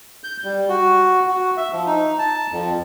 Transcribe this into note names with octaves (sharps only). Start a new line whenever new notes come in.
G6
G3
F#4
F#4
E5
F3
D#4
A5
F2